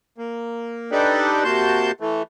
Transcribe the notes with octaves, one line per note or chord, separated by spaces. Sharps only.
A#3
D4 D#4 G4 A4 B4 D5
C3 A#3 F#4 A5 C6 G6
E3 A3